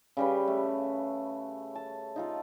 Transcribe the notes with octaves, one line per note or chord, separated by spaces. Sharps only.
C#3 G3 B4
A3
A5
D#4 F4 A4